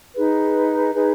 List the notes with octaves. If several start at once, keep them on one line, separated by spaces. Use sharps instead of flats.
D#4 G#4 B4
D#4 G#4 B4